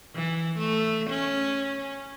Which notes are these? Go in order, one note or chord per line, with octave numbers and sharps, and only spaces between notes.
E3
A3
C#4